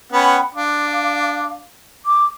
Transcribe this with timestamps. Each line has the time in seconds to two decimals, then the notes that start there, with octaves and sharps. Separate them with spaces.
0.12 B3 C#4 F#5 G5 B5
0.55 D4 F5 D6
2.06 D6